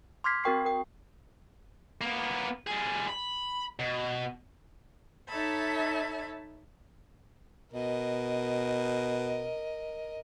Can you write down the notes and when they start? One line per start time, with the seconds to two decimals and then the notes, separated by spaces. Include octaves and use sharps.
0.24 C6 D6 F6 G#6 B6 C7
0.44 C4 F#4 A#4 G5 C#6 C7
0.65 A#4 G5
2.01 A#3 B3
2.67 G3 G#4
3.08 B5
3.79 B2
5.28 D#4 A4 C#5 E5 A5 B5
7.74 B2 A#4 D#5